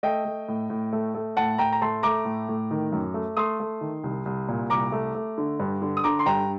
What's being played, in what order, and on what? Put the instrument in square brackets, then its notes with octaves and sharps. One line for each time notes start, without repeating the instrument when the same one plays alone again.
[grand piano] A3 D#5 G5
A3
A2
A2
A3
A3
A2 F#5 A5
A2 G5 A#5
A#5
A3 A5 C6
A3 A#5 D6
A2
A2
D#3
F#2
A3
A3 C6 D#6
A3
D#3
C2
C2
A#2
C2 A#5 D6
A3
A3
D3
G2
D3
D#6
D3 A#5 D6
C6
G2 G5 A#5